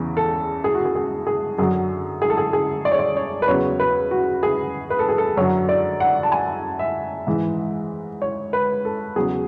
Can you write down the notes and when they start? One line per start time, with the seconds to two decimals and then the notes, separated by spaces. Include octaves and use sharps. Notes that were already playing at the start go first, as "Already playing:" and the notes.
Already playing: E2 C#3 E3
0.17 A4
0.64 G#4
0.75 F#4
0.85 G#4
0.95 G#4
1.27 G#4
1.58 F#2 D3 F#3 G#4
2.22 G#4
2.30 A4
2.37 G#4
2.53 G#4
2.85 D5
2.92 C#5
2.99 D5
3.17 C#5
3.42 B4
3.48 E2 C#3 F#3 C#5
3.80 B4
4.11 F#4
4.43 G#4
4.90 B4
4.99 A4
5.09 G#4
5.18 A4
5.37 F#2 D3 F#3 C#5
5.69 D5
6.00 F#5
6.23 A5
6.32 G#5
6.79 E5
7.27 G#2 E3
8.22 C#5
8.53 B4
8.85 A4
9.16 E2 C#3 F#3 G#4